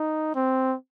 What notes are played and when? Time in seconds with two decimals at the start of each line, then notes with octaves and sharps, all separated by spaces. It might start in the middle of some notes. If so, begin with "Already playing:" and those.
Already playing: D#4
0.35 C4